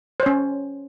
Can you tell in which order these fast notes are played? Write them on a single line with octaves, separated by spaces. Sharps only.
C5 C#5 C#4